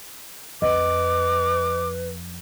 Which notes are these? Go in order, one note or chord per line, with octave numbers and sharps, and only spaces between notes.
F2 B4 D#5 D6